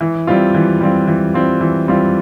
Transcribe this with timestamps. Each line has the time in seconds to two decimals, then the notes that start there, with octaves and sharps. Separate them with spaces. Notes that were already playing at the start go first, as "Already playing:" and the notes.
0.01 E3
0.27 G3 C4 F4
0.54 E3
0.81 G3 C4 F4
1.07 E3
1.34 G3 C4 F4
1.61 E3
1.88 G3 C4 F4